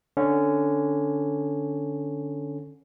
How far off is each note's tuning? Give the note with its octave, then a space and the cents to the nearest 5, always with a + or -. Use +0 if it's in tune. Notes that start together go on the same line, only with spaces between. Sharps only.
D3 +0 C#4 +0